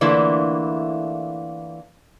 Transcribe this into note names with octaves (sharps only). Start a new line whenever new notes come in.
D3 E3 A3 A#3 E4 F4